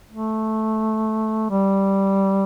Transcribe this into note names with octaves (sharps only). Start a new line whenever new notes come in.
A3
G3